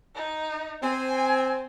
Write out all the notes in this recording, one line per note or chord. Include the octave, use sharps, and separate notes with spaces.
D#4
C4 G#5